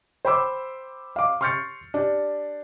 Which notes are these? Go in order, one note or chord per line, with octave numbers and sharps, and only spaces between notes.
C5 G5 B5 C6 D6 E6
F5 D6
C6 C#6 F6 G6 A6 C#7
D4 G4